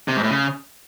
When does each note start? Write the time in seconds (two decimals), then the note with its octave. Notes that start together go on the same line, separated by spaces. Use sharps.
0.08 C3
0.16 G#2
0.23 A2
0.31 C#3